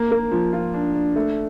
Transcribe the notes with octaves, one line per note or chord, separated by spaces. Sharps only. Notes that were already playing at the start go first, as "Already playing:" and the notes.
Already playing: A#3
A#3
F3
F4
D4
D4
A3